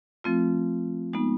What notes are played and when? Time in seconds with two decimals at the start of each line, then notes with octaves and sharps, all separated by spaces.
0.24 F3 A3 C4 F4
1.13 G#3 B3 D#4